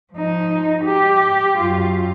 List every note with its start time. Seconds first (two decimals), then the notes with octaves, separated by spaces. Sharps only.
0.13 F3 D#4
0.84 G4
1.58 F#2 F4